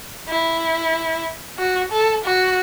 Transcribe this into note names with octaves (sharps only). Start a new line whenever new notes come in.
E4
F#4
A4
F#4